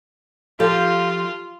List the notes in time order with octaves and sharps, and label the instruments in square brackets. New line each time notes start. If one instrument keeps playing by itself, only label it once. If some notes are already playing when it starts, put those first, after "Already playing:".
[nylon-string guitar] F3 G4 A4 [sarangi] F4